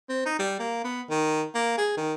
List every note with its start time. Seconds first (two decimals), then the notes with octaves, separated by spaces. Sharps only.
0.09 C4
0.26 D#4
0.39 G3
0.59 A#3
0.84 B3
1.10 D#3
1.55 A#3
1.78 G#4
1.97 D#3